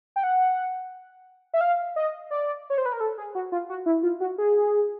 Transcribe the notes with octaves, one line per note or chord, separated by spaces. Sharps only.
G5
F#5
E5
F5
D#5
D5
C#5
C5
B4
A#4
A4
G#4
F#4
F4
F#4
E4
F4
F#4
G#4